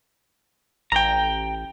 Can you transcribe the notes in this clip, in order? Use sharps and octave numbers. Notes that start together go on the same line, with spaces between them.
A1 G5 A#5